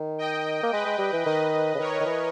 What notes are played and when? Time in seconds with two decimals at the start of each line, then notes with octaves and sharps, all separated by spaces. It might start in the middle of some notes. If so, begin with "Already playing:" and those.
Already playing: D#3
0.18 D#5 G5
0.63 A#3
0.72 G#3 B4 D#5
0.86 G#3
0.99 G3
1.13 E3
1.26 D#3 B4 D#5
1.75 C#3
1.79 D#3 A#4 C#5
2.01 D#3
2.06 E3